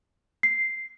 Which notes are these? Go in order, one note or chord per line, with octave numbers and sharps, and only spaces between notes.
C7